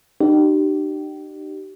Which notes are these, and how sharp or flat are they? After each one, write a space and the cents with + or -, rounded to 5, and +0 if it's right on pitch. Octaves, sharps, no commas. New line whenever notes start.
D#4 -45 G4 -30